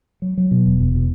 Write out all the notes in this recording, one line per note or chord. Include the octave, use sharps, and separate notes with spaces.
F#3
F#3
B2
E1
E2
B2